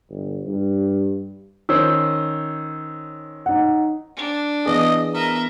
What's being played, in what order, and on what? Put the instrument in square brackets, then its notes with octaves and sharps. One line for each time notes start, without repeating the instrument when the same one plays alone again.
[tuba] G1
G2
[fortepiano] D#3 C#4 C5 [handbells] E6
[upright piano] D#4 F#5
[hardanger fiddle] D4
[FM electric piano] E3 B3 G#4 [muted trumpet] D#5
[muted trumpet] A#4 [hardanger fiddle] D#5 E5